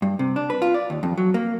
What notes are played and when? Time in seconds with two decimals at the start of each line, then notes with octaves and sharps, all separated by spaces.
0.02 G2
0.19 C3
0.36 D4
0.50 B4
0.62 F4
0.74 D5
0.90 D#2
1.03 F2
1.17 F#3
1.34 A#3